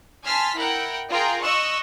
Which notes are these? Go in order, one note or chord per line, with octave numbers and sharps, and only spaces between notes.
G#5 A5 C6 F6 B6
E4 A#4 F#5 G5
F4 G#4 A#4 G5 A#5
D#5 C#6 E6 F#6